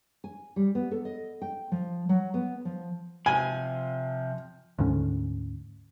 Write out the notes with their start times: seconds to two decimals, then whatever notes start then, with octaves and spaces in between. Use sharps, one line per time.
0.24 G#5
0.56 G3
0.75 B3
0.91 A4
1.05 D#5
1.42 G5
1.72 F3
2.09 F#3
2.34 B3
2.65 F3
3.26 C3 F3 G#5
4.79 D2 G#2 D3 C#4